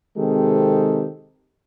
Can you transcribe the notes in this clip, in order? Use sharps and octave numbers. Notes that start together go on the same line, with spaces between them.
C3 D#3 G#3 C4 G4 A4